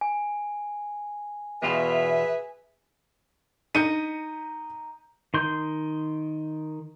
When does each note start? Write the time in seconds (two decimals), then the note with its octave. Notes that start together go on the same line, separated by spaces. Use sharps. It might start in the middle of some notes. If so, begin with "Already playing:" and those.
0.01 G#5
1.62 E2 B2 F4 G#4 B4 E5
3.75 D#4 G6 C#7 D#7
5.34 D#3 C6 G6